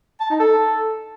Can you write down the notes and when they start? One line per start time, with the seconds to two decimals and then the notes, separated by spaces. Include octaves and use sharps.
0.20 A5
0.30 D#4
0.40 A4